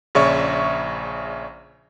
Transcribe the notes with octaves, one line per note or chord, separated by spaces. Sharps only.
A#1 C#3 C#5 D5 E5 C#6